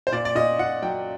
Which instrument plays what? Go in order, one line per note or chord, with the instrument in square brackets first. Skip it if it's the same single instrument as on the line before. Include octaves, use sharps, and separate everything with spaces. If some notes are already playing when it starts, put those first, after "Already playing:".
[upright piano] C5
A#2 D5
D5
A#2 D#5
A#2 F#5
F#3 G5